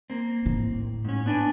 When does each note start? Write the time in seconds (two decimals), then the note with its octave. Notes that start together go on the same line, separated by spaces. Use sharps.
0.10 A#3 C4
0.46 A2
1.05 G#2 C#4
1.26 B3 D4 G#5